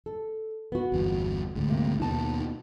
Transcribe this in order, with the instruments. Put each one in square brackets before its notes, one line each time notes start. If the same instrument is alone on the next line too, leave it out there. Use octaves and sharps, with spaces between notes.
[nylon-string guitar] A4
B3 F#4
[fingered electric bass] G1 E2 G2
D2 G#2
[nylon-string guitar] C3 A#3
[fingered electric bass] D#2 B2 [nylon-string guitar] D#4 A5